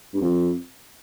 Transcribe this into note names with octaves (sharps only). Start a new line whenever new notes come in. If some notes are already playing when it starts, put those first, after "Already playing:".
G2
F2